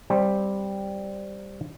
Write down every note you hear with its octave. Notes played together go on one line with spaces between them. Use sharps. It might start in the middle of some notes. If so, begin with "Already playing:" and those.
G3 C4 C5